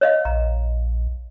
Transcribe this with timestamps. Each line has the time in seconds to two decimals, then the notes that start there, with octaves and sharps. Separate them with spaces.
0.01 C#5 D#5 F5
0.25 A#1 A#5